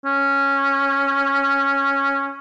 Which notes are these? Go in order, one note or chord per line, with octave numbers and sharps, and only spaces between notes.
C#4